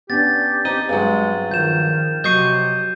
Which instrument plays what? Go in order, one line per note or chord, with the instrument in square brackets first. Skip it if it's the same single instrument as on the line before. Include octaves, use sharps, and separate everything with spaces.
[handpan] B3 C#4 D4 [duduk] G4 [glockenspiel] A6
[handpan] C4 [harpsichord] D#4 [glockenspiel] D#7
[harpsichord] G2 F#3 [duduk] G#3 [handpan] G#4
[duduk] D#3 [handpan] F3 [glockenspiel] G6 E7
[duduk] C3 [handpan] F#3 [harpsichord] D#5 C#6 [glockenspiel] G6 C7 D#7